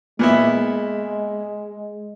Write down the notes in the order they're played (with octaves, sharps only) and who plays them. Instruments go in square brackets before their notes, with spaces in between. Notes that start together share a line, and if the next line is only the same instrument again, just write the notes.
[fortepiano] A#2 B3 E4 [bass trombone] G#3